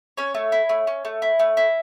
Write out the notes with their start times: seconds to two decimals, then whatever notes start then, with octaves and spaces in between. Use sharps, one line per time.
0.17 C#4 C#5
0.35 A3
0.52 E4
0.69 A3
0.87 C#4
1.05 A3
1.22 E4
1.39 A3
1.57 E4